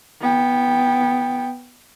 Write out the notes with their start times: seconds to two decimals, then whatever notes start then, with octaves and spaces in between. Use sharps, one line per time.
0.21 B3 G5